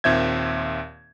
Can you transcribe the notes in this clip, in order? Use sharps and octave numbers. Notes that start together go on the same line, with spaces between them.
D#2 A#2 C4 E5 G6 G#6